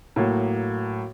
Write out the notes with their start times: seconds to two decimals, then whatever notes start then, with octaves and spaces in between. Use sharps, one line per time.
0.16 A2 F#3 A#3